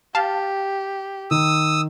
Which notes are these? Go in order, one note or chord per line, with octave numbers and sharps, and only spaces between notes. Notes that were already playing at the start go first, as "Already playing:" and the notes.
G4 F5 A5
D#3 D#6 E6